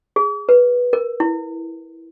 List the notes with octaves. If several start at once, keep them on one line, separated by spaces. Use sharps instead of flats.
G#4
B4
A#4
E4